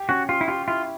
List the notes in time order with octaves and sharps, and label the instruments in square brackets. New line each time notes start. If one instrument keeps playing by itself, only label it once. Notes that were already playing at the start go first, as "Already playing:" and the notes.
Already playing: [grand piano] G4
[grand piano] C#4 [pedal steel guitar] F#4
[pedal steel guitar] F4 [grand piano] G4
[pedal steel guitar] E4
[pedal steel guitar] F4 [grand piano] G4
[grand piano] E4 [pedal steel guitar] F4